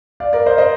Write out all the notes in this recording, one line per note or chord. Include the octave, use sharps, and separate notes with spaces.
D5 F5
A#4 D5
C5 D#5
C5 D#5